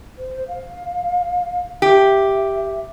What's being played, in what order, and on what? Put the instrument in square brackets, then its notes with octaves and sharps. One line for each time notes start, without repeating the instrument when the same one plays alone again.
[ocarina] C5
F5
[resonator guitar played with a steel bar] G4 [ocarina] E5